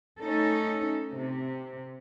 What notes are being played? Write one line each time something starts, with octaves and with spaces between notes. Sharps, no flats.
A3 C#4 D#4 A4
C3